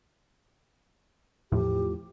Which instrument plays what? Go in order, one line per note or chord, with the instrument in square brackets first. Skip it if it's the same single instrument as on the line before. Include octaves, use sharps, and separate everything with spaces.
[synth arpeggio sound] E2 A2 F3 [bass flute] G4